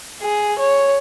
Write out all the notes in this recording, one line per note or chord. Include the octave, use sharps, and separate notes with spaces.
G#4
C#5